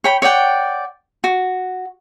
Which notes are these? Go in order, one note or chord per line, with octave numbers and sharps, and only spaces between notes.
C#5 G5 B5
C#5 D5 F#5 G5
F#4